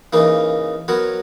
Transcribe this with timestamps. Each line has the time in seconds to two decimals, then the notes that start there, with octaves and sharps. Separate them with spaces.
0.13 C#3 E3 A#3 D#4 A#4
0.88 F#3 B3 F#4 A#4 C#5